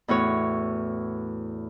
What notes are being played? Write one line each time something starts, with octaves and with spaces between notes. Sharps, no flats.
E2 A2 F#4 C#5